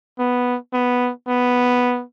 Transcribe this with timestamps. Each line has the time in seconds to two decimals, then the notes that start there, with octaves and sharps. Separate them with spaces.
0.19 B3
0.73 B3
1.28 B3